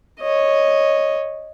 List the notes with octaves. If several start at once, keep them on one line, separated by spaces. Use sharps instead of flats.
C#5 D#5